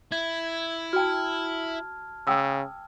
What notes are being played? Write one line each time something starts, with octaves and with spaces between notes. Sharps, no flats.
E4 G#6
F#4 G5 A5 F6
C#3 G5 D#6 E6